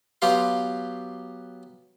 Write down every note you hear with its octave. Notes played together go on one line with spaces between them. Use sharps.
F#3 B3 G4 F5 C6